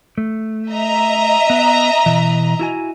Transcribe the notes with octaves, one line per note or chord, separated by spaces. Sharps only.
A3
D#5 E5 A#5
B3
B2 E3
E4 F#4 G#5